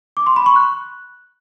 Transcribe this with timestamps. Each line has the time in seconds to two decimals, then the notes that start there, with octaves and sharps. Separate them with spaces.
0.17 D6
0.26 C6
0.36 B5
0.46 C#6
0.56 F#6